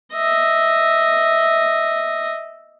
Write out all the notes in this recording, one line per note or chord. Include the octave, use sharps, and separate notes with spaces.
D#5 E5